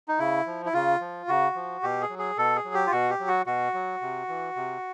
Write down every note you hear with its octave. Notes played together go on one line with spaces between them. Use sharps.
D#4
C#3 E4
F3
E4
C#3 F4
F3
C#3 F#4
F3
B2 G4
G#4
F#3
G#4
B2 A4
G#4
F#3
G4
F4
B2 F#4
G4
F#3
F#4
B2 F#4
F#3
C3
E3
C3